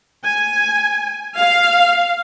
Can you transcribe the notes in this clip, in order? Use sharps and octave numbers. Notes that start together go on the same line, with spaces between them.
G#5
F5